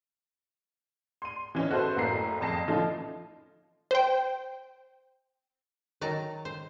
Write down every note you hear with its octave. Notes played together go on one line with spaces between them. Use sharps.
C6 D#7
E3 C#4 D#4
F#4 A4 B4 C5 F#5
F#1 A2 A#3 A#5 C7
F#1 F2 A5 A#6 C7
E3 F3 A3 C#4 D#4 F4
C5 G5
D#3 F#3 A5 A#5
C5